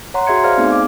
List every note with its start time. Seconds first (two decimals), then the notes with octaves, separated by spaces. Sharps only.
0.14 C#5 F#5 A#5 C6
0.27 F#4 G#4 E5 C6 G#6 C#7
0.44 G#4 C5 D5 F5 F6 G#6
0.57 A3 B3 C4 D#4 G#4
0.72 D6